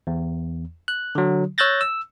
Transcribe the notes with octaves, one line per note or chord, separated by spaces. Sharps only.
E2
F#6
D3 F#3
C#5 E6 F#6 G6 A6 A#6
E6